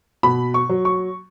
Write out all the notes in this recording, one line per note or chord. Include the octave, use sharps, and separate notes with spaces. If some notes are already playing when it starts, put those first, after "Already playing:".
B2 B5
C#6
F#3
C#6